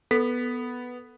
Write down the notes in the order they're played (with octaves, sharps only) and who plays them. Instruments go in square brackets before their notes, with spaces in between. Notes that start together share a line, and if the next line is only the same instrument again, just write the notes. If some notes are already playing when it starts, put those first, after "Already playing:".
[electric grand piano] B3 B6 [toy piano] A4